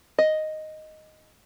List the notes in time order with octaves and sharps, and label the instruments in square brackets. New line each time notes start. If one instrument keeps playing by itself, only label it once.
[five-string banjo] D#5